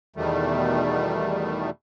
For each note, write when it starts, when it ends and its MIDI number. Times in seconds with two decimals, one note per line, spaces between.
0.16 1.70 40
0.16 1.70 47
0.16 1.70 51
0.16 1.70 55
0.16 1.70 57